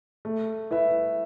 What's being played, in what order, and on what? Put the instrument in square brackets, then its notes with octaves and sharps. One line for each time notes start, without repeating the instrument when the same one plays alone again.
[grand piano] A3
E4 B4 E5